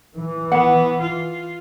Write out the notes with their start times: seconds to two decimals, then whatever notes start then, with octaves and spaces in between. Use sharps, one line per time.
0.16 E3
0.52 B3 F#5
1.01 F4